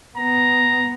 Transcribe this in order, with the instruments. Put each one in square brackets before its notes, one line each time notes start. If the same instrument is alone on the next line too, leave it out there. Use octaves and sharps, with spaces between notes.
[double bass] B3 [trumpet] A#5